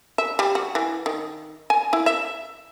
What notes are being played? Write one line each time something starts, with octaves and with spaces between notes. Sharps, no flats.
E5
G3
F#4
E3
D#3
G#5
E4
E5